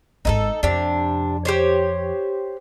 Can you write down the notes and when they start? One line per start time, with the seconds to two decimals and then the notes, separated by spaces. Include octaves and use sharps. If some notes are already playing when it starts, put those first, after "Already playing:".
0.25 G#1 G#2 D#4 E4 A4
0.63 F2 C3 D4
1.45 G4 C5 C#5